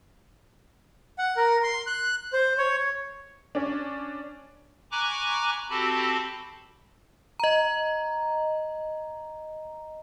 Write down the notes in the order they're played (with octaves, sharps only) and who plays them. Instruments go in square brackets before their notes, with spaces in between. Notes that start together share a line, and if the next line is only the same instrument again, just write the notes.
[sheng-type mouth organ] F#5
A#4
C6
F#6
C5
C#5
[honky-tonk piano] C#4 D4
[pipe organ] G#5 A#5 B5 C#6 D6 F#6
C4 F#4 G4 A4 A5 B5
[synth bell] D#5 A#5